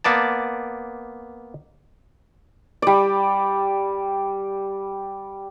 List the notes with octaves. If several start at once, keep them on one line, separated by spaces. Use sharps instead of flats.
A#3 B3 D5 A5
G3 D5